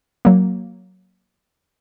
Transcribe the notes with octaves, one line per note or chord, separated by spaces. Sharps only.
F#3 A#3